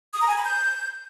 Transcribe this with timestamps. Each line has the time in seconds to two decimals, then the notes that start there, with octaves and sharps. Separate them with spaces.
0.14 D#6
0.21 A#5
0.29 G#5
0.36 B5
0.44 G6